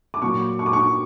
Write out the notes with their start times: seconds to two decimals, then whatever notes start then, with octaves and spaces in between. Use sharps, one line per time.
0.14 D6
0.22 A#2 F#3 C#6
0.59 C#6
0.66 D6
0.73 C#6